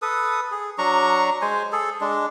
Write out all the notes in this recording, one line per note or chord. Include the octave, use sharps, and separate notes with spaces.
A4 B4 D#6
G#4
F#3 D4 A#5 C#6
G#3 C5 G#5
G#4 A4
G#3 D4